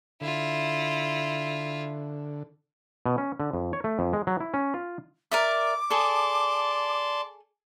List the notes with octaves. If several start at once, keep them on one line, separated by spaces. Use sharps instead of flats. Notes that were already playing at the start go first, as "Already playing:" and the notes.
D3 E4 F4
B2
C#4
D3
F2
C#5
A3
F2
G#3
F#3
E4
C#4
F4
A#4 D5 E5 D6
G#4 A4 D5 A5 C6